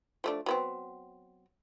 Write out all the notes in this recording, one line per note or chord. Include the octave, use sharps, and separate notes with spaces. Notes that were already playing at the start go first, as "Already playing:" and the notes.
F3 A3 D4
F#3 B3 C4